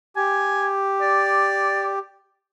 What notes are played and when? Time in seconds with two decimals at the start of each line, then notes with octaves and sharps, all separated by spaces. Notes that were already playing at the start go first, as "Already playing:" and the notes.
0.16 G4 G#5
1.01 D5